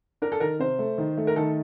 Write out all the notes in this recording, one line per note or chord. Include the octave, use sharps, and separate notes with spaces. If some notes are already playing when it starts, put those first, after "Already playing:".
D4 A#4
A4
D#3 A#4
C3 C5
A3
D#3
A3
A#4
D#3 A4